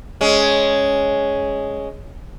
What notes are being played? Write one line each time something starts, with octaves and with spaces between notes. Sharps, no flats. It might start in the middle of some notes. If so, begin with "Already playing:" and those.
G#3 C#4